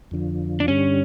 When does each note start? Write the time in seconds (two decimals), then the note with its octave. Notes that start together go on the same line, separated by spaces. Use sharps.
0.11 F2 D3 F3
0.60 D4
0.68 G2 D3 G3 C#4